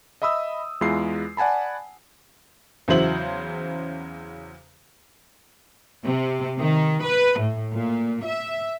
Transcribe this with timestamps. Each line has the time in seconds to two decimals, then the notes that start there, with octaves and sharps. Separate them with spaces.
0.22 D#5 E5 B5 D#6 E6
0.81 E2 G#3 E4 F4 C7
1.37 D5 F#5 G#5 A5 B5
2.88 E2 C#3 F#3 E4 C5 F#7
6.05 C3
6.59 D#3
7.04 B4
7.39 A2
7.72 A#2
8.25 E5